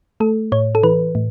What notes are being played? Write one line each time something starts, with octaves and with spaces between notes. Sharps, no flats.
A3 A4
A2 C#5
A4
E3 B4
A2